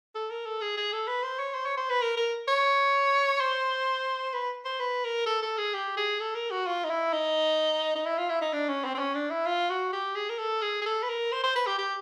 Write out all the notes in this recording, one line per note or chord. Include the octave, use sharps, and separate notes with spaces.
A4
A#4
A4
G#4
G#4
A4
B4
C5
C#5
C5
C#5
C5
B4
A#4
A#4
C#5
C5
B4
C5
B4
A#4
A4
A4
G#4
G4
G#4
A4
A#4
F#4
F4
D#4
E4
D#4
D#4
E4
F4
E4
D#4
D4
C#4
C4
C4
C#4
D4
E4
F4
F#4
G4
G#4
A#4
A4
G#4
G#4
A4
B4
A#4
C5
C5
B4
G4
G4